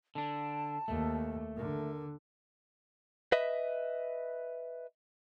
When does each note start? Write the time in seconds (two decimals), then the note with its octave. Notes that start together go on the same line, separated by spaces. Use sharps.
0.15 D3 D4 A5
0.88 D#2 A3
1.57 D3 A#4
3.32 B4 D#5 E5